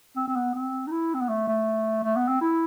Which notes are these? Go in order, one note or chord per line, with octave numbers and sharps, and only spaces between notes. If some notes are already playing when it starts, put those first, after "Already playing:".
C4
C4
B3
C4
D#4
E4
C4
B3
A3
A3
A3
B3
C4
E4